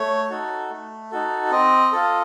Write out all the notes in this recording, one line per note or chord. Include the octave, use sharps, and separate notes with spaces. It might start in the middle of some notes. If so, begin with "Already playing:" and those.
Already playing: A3 C#5
D#4 F#4 A4
A3
D#4 F#4 A4
C4 D#5
F4 A4